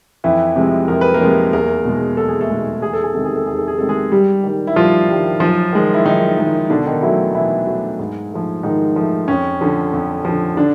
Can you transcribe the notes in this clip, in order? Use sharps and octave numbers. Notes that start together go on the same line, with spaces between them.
F2 E3 E4
C3 F3 G#3
F2 A#4
B4
A#3 A#4
C3 F3 G#3
E2 A#3 A#4
B2 G#3
E2 A4
G#4
A3 A4
B2 G#3
E2 G#4
A4
G#4
C3 D#3 G#3 A4
G#4
A4
E2 G#4
A4
G#4
C3 D#3 G#3 A4
G#3 G#4
G2 G3 G4
D#3 G3
E4
G2 F3 F4
D#3 G3
F#2 F3 F4
D#3 G#3
E4
F#2 D#3 D#4
D#3 G#3
B2 D3 D4
D#3 D#4
E3 F#3 A3 E4
B2 E3 E4
F#3 A3
G#2
F3 A3
G#2 D#3 D#4
F3 A3
F2 C#4
D3 F3
F2
D3 F3
D3 D4